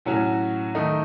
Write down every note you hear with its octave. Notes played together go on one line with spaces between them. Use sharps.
A2 F#3 C#4 F#4
D#3 A3 D#4